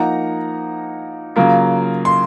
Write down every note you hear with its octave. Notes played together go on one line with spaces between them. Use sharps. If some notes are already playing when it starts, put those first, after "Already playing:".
Already playing: F3 A#3 D#4 F#5 A#5
C#3 F#3 A#3 F4
C6